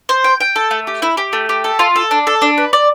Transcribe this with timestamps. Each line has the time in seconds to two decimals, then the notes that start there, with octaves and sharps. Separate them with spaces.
0.09 C5
0.24 G5
0.40 G5
0.56 A4
0.71 A3
0.87 G4
1.02 E4
1.17 G4
1.33 A3
1.49 G4
1.64 A4
1.79 F4
1.96 A4
2.11 D4
2.27 A4
2.42 D4
2.58 B4
2.73 D5